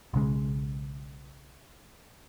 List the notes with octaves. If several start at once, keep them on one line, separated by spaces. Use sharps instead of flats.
B1 C#3 G#3